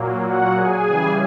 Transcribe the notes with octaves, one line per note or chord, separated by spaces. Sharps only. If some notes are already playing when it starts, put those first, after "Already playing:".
Already playing: A#2 F#3 A#3
F#4 F#5
G#4 G#5
C#3 E3 G3